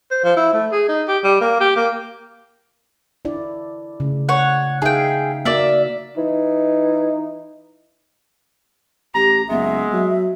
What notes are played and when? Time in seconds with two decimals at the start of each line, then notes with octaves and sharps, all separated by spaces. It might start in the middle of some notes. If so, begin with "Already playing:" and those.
0.11 C5
0.24 F3
0.37 E4
0.54 A3
0.72 G#4
0.89 D#4
1.08 G4
1.24 G3
1.41 A#3
1.60 G4
1.76 A#3
3.25 D4 E4 D5
4.00 C#3 A3
4.29 C#5 F#5
4.82 D#4 G#4 E5 F5 G5
5.45 A#3 F#4 A#4 D5 E5
6.18 E3 D#4
9.15 A1 G4 A#5
9.49 F#1 G#3 B3 E5
9.93 F#3